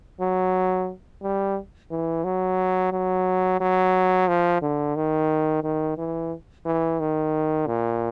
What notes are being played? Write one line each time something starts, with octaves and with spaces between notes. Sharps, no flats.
F#3
G3
E3
F#3
F#3
F#3
F3
D3
D#3
D#3
E3
E3
D#3
A#2